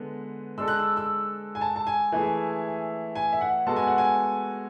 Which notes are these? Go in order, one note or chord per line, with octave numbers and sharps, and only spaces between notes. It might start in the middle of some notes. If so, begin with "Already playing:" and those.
Already playing: D3 G#3 B3
G#3 D4 A4 E6
F#6
E6
E6
G#5
A5
A5
G#5
E3 A3 E4 G#4
G#5
E5
F#5
G#3 B3 F#4 A4 A5
G#5
F#5
G#5